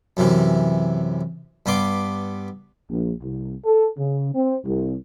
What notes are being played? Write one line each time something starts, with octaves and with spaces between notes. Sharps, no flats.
F#2 C3 E3
G2 B3 C6 D6
A#1
C2
A4
C#3
C4
C2